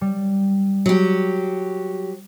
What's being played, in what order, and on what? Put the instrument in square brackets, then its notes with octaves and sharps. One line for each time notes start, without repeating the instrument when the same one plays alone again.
[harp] G3
[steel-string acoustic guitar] F#3 G4